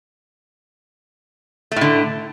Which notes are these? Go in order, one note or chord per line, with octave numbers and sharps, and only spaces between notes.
A2 D3 A3